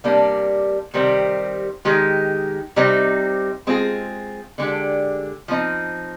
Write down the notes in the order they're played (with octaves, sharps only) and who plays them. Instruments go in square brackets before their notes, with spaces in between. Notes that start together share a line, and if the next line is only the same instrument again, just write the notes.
[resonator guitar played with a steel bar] C3 G3 A#3 D4
C3 D#3 G3 C4
D#3 G#3 D#4 G4
C3 G3 C4 D#4
G#3 C4 F4 G#4
D3 G#3 D4 G4
F3 C4 D#4